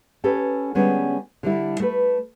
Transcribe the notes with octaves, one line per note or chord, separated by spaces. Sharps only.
C#4 G4 A4 B4
D3 G3 G#3 B3 C#4 D4
D3 G3 E4
A3 B4